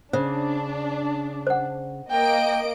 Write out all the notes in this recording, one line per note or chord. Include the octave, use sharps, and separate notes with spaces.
C#3 D4 C5
C5 F#5
A#3 D#5 G5 D7